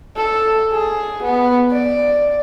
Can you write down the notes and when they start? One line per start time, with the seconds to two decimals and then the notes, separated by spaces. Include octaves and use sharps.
0.17 A4
0.72 G#4
1.24 B3
1.71 D5